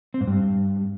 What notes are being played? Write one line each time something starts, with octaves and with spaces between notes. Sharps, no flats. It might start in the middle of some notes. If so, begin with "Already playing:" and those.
C4
G#2
G2